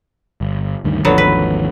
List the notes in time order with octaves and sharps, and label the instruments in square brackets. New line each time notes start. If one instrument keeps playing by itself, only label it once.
[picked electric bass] G1
D2 G2 D#3
[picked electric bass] G#1 D#2 F3 [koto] D3 F#3 B3
[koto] B4